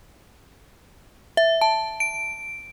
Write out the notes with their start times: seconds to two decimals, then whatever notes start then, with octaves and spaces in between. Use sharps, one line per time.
1.37 E5
1.61 A5
2.00 D7